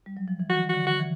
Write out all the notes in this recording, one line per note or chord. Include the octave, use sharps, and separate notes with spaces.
G3
F#3
F3
E3
D#3 F#4
F#4
D3
F#4
E3